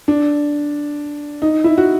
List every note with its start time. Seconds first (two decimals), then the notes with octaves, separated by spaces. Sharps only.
0.08 D4
1.42 D#4
1.64 E4
1.78 F#4